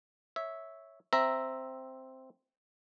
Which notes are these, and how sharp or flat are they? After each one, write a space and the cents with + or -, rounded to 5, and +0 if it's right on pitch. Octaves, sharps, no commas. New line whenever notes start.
C#5 +0 E5 -10
C4 +0 E5 +0 A#5 +0